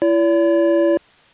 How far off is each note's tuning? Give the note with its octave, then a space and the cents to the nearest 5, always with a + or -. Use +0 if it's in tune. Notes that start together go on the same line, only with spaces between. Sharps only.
E4 +35 D5 -45